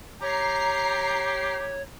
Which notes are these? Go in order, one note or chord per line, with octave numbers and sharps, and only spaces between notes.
G4 C#5 A#5 C7